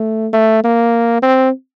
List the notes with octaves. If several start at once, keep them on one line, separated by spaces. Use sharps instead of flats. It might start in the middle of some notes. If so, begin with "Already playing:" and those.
Already playing: A3
A3
A#3
C4